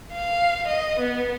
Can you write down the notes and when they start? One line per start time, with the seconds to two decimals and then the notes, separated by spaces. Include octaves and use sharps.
0.13 F5
0.67 D#5
0.99 B3